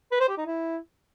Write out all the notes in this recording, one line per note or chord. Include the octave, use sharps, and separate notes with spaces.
B4
C5
G4
D#4
E4